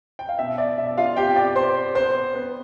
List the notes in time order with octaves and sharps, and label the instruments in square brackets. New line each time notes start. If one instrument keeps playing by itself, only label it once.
[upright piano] G5
F5
B2 E5
D5
B2 E5
F4 F5
C3 G4 G5
D5 D6
B3 C5 C6
B3 C5 C6
B3